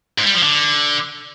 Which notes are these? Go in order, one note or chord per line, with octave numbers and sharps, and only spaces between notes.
G#2
G3
F3
D3